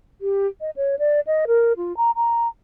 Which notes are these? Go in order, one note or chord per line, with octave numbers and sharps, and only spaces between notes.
G4
D#5
C#5
D5
D#5
A#4
F4
A#5
A#5